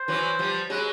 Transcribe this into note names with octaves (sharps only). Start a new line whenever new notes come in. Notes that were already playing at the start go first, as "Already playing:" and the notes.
Already playing: C5
E3 F#3
F3 G3
F#3 G#3 B4